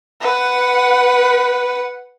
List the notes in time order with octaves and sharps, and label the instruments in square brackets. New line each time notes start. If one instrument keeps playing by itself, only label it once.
[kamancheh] B4 F#5